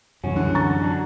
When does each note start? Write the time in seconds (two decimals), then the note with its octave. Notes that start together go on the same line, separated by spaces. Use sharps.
0.24 C2 F#2 E3 F#3 C#4 F#4
0.36 D3
0.55 A#5 C#6 A6
0.82 F#3 D4